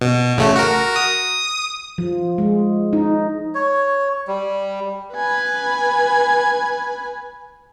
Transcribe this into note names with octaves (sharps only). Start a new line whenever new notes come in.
B2
A1 C#3 A3
F#4 A#4
D#6
F3
G#3
D#4
C#5
G3
B4 G#5